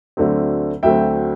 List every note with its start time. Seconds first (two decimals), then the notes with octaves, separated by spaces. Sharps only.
0.17 D2 D3 F#3 A3 C4
0.83 D2 D3 F#3 A3 C4 E5 G5